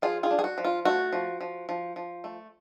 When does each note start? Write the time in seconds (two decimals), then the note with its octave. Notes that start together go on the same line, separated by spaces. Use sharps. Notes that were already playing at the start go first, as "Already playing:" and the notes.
0.02 F3 F4 G#4
0.23 F4 G#4
0.31 D4
0.39 G#4
0.44 F#4
0.58 F3
0.65 F4
0.85 A3 F#4
1.13 F3
1.41 F3
1.69 F3
1.96 F3
2.24 A3